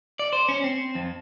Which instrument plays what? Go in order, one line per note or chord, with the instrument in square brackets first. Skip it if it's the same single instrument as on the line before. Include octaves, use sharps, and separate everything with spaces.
[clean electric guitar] D5
C5
C#4
C4
F2